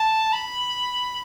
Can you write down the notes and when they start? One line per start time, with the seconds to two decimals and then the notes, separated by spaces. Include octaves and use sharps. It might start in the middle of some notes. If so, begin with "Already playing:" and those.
Already playing: A5
0.33 B5